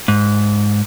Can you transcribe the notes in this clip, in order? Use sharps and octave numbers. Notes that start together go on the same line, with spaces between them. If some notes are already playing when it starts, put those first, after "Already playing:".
G#2